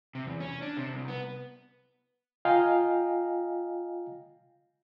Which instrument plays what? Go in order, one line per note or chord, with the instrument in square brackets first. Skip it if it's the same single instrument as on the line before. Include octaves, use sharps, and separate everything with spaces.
[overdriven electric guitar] C3
E2
C#4
D4
C3
C2
B3
[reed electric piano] F4 D#5 F5 G5 G#5 A#5